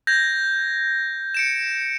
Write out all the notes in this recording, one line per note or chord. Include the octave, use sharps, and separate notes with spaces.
G6 G#6 A#6
C#7 D7 E7